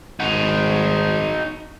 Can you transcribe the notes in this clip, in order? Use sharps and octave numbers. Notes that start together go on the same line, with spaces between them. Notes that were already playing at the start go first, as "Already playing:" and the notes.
G#1 D#4 F#4